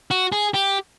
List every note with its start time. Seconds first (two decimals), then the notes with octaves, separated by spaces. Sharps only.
0.11 F#4
0.32 G#4
0.54 G4